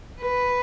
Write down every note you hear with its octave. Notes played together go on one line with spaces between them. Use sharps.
B4